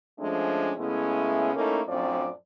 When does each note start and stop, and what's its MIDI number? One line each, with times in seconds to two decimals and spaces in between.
0.19 0.72 53
0.19 0.72 56
0.19 0.72 57
0.19 0.72 61
0.19 0.72 62
0.77 1.55 49
0.77 1.55 56
0.77 1.55 57
0.77 1.55 59
0.77 1.55 61
0.77 1.55 64
1.55 1.79 57
1.55 1.79 58
1.55 1.79 61
1.55 1.79 63
1.55 1.79 64
1.55 1.79 69
1.87 2.28 42
1.87 2.28 45
1.87 2.28 53
1.87 2.28 60
1.87 2.28 62
1.87 2.28 74